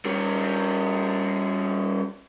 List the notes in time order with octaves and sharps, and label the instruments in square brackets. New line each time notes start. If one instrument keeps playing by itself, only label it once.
[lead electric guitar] G3 C#4